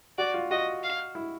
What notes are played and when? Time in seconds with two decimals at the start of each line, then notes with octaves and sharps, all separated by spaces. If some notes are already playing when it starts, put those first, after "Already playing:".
0.18 F#4 D5
0.34 F4
0.51 F#4 D#5
0.83 F5
1.15 E4